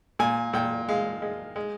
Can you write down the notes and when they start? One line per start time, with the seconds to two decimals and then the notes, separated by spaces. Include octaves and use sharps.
0.19 A#2 G#5
0.53 A#2 G5
0.89 G#3 F5
1.22 G#3
1.56 G#3